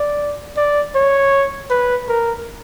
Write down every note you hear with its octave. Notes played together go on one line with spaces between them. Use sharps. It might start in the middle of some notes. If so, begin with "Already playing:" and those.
Already playing: D5
D5
C#5
B4
A#4